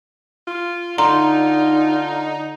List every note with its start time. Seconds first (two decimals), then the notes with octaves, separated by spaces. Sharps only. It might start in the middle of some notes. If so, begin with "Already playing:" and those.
0.47 F4
0.98 D3 D#4 F4 A#5 C6